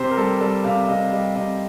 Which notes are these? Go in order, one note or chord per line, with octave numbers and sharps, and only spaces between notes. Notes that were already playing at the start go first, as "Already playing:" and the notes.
Already playing: C3 C5
A#4
G3 A4
G3 A4
C3 F5
F5
C3 D#5
G3 D#5
C3 D#5